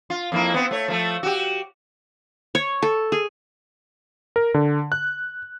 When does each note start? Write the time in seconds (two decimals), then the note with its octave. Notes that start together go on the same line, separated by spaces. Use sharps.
0.10 F4
0.32 F2 A#3 E4
0.54 B3 C4
0.71 A3 C#5
0.88 F3 A3
1.23 F#4 G4
2.55 C#5
2.82 A4
3.12 G#4
4.36 A#4
4.54 D3
4.92 F#6